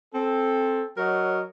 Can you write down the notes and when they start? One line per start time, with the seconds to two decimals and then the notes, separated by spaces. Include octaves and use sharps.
0.15 C4 A4
0.98 F#3 F#4 A#4 C#5 D#5